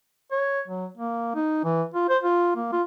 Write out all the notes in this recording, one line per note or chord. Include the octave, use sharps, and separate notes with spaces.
C#5
F#3
A#3
D#4
E3
F4
C5
F4
A#3
F4